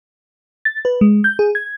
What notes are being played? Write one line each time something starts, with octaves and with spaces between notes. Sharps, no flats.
A6
B4
G#3
G6
G#4
G#6